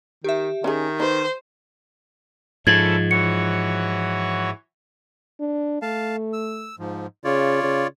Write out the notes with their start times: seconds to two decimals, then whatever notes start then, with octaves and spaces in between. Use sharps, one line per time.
0.24 D#3 G4 E5
0.64 D#3 C#4 D#4 G#4
1.00 D#4 B4 C5
2.67 G#2 F3 C#4 E4 A4 G#6 A6 F#7
3.11 E3 F#4 C#5 C#7
5.40 D4
5.82 A3 F5 A5
6.33 E6
6.79 G#2 F3
7.24 C#3 F4 C#5 D5
7.63 C#3